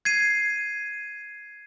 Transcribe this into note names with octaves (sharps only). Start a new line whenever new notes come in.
G#6 C7 D#7